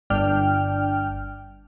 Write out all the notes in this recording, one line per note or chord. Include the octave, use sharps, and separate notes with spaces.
G1 D4 G5 F6